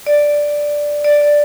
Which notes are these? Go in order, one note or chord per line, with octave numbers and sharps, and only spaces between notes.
D5
D5
D5